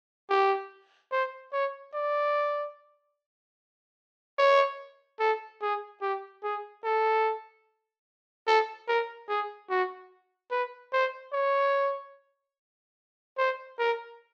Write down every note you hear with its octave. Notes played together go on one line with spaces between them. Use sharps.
G4
C5
C#5
D5
C#5
A4
G#4
G4
G#4
A4
A4
A#4
G#4
F#4
B4
C5
C#5
C5
A#4